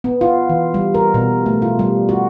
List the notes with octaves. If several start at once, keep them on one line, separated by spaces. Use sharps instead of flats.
B3
F4
E3
G3
A#4
B2
A3
F4
G3
F#4